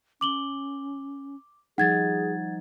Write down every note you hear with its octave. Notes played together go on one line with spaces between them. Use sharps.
C#4 D6 F#7 G7
F3 G3 D#4 G#4 F#5 G#6 A6